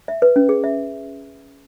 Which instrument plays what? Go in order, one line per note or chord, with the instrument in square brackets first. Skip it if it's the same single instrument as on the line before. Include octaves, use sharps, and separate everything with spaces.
[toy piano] E5
B4
C#4
G#4
E5